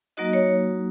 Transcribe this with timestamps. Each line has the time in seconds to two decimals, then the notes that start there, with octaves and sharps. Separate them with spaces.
0.17 F#3 A#3 D#4 F#4 D#5
0.33 C#5